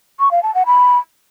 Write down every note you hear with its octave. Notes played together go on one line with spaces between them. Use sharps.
C#6
F5
A5
F#5
B5